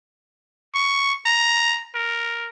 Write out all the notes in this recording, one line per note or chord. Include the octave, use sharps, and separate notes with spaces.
C#6
A#5
A#4